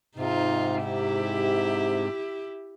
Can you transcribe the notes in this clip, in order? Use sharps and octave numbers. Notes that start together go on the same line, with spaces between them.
G#2 C3 D#4 F4
E4 G4